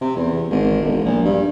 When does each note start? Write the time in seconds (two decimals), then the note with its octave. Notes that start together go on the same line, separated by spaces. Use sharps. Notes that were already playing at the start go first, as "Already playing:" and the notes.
0.01 C3
0.16 E2
0.50 G#1
0.81 E1
1.05 A#1
1.25 G2